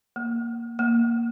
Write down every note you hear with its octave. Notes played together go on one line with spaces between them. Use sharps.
A#3
A#3